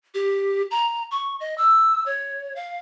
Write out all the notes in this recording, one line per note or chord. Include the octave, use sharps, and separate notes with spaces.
G4
A#5
C#6
D#5
E6
C#5
F5